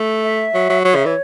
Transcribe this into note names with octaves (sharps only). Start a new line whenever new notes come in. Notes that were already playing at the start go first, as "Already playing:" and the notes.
Already playing: A3
E5
F#3
F#3
F#3 C#5
C#3 E5
E3 C#5